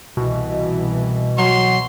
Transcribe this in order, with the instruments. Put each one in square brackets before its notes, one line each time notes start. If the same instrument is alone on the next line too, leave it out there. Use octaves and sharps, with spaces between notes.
[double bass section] C2 E3 [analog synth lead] B2
[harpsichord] F#3 [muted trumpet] C6